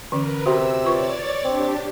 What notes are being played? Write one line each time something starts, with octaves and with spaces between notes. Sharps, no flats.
D3 E3 C#4 A#4 B4
C3 F#4 C6 E6
F4 B4 C#5 D5 C#6 A6
C4 D4 G4